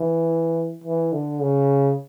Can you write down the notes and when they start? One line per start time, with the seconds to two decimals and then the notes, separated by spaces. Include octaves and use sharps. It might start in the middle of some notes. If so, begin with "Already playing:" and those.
Already playing: E3
0.84 E3
1.13 D3
1.41 C#3